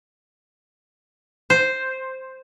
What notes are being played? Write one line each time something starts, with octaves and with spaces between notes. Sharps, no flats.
C5